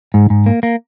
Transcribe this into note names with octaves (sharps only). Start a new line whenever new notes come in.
G#2
G#2
A#3
A#3